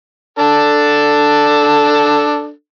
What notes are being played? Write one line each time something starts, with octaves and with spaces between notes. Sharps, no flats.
D4 A4